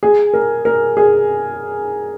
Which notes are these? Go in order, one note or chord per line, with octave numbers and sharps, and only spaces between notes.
G#4
A#4
A#4
G#4